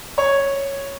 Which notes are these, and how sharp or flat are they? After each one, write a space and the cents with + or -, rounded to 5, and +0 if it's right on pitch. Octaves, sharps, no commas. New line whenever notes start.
C#5 -5